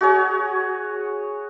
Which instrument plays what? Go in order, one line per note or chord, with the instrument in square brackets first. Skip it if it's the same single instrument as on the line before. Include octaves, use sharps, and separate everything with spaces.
[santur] F#4 G#4 C#5